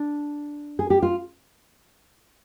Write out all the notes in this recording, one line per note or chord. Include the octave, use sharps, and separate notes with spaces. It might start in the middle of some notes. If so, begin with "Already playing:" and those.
Already playing: D4
G#4
G4
F4